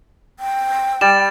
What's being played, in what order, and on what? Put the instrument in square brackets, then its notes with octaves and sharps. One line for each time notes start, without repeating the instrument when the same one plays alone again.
[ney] G5
[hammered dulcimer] G3 [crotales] A6 E7